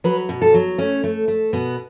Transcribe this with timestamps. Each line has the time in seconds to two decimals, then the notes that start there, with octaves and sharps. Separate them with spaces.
0.04 F#3 B4
0.29 B2
0.42 A4
0.54 F#3
0.78 A3 C#4
1.04 A3
1.28 A3
1.53 B2 B3